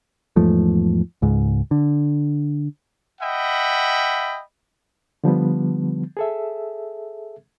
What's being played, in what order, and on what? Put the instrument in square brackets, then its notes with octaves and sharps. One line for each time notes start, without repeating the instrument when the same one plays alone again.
[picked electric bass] E2 G#2 F3 A3
C#2 G#2
D3
[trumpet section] D#5 E5 F#5 G5 B5
[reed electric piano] D3 F3 G3 B3
G#4 A4 E5